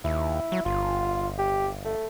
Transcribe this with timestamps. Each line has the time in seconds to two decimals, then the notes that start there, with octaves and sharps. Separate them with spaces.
0.04 D#2 E4
0.52 F#3
0.65 G1 F4
1.39 G4
1.85 A3